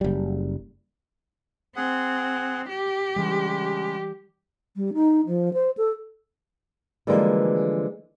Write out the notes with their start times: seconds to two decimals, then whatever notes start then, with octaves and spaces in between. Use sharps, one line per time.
0.01 F#1 G3
1.76 C4 G#4 F#5
2.69 G4
3.16 C#3 E3 G3 G#3
4.76 G3
4.94 D#4
5.27 F3
5.53 C5
5.77 A4
7.07 D3 E3 F3 G3 G#3 A#3